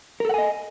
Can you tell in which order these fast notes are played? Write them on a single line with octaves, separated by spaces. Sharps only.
A#4 A4 F#5 G#5 D#5